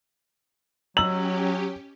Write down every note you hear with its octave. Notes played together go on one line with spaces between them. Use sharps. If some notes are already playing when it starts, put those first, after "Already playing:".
F#3 C#4 G4 D#5 A#5 E6 F#7